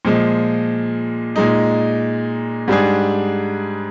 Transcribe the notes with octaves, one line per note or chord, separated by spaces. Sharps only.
A#2 F3 G#3
A#2 G#3 D#4
G#2 G3 D4 G#4